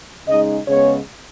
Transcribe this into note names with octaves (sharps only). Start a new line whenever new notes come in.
C#3 G#3 D#4 D#5
C#3 G#3 B3 C#5